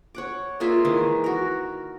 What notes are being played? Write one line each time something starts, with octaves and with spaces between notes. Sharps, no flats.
C#5 F#5 D6
G#3 A#3 F4 E5
D#3 E3 G#3
F#4 A#4